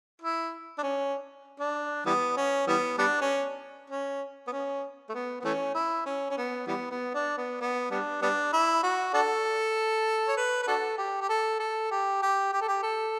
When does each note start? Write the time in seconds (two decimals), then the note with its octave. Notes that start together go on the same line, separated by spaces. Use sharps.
0.22 E4
0.78 D4
0.83 C#4
1.60 D4
2.06 E3 G3 B3
2.37 C#4
2.67 E3 G3 B3
2.98 G3 B3 D4
3.21 C#4
3.90 C#4
4.47 B3
4.52 C#4
5.09 A3
5.14 B3
5.40 B3
5.44 E3 A3 C#4
5.75 E4
6.06 C#4
6.30 C#4
6.37 B3
6.67 E3 G3 B3
6.91 B3
7.14 D4
7.37 B3
7.60 B3
7.91 G3 B3 D4
8.22 G3 B3 D4
8.53 E4
8.83 F#4
9.13 D4 F#4 A4
10.28 C#5
10.37 B4
10.62 B4
10.68 D4 F#4 A4
10.98 G4
11.21 G4
11.29 A4
11.60 A4
11.91 G4
12.22 G4
12.53 G4
12.61 A4
12.68 G4
12.83 A4